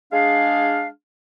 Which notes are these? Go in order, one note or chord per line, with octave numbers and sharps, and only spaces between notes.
G#3 D4 G#4 F5